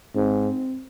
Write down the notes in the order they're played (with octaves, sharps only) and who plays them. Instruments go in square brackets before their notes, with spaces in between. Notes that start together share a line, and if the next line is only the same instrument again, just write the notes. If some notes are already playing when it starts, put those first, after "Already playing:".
[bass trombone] G#2 [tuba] C4